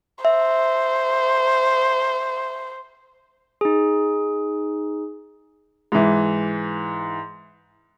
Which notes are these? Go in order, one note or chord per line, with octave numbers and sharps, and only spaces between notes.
C5 E5
D#4 G#4
G#2 E3